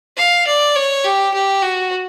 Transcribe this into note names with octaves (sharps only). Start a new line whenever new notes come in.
F5
D5
C#5
G4
G4
F#4